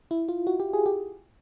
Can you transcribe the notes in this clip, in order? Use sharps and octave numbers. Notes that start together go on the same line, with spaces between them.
E4
F4
F#4
G4
G#4
G4